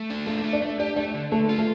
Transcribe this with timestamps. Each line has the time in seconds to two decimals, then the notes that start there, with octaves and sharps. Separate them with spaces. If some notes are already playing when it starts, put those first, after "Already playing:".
Already playing: A3
0.10 D4
0.26 A3 F4
0.44 A3
0.53 D4
0.62 A3
0.79 D4 G4
0.96 A3 D4
1.14 D3
1.32 D3 A3
1.49 F4
1.58 A3